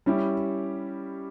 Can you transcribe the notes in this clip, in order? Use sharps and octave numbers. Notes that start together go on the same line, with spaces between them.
G3 C#4 E4 G4